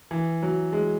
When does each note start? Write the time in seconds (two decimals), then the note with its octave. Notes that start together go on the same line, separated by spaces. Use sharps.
0.11 E3
0.43 F#3
0.73 G#3